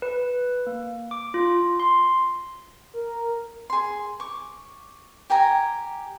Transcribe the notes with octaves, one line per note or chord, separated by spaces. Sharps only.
B4
A#3
D6
F4
C6
A#4
G#4 C6
C#6 D6
G4 G5 G#5 A#5